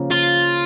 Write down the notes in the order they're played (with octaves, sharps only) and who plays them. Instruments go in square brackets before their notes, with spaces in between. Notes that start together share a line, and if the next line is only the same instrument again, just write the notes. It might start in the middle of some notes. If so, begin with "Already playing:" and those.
Already playing: [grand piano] C#3 F3 A#3
[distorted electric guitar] F4